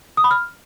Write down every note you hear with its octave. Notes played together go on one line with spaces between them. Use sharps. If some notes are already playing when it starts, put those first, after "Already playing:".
D#6
B5
F6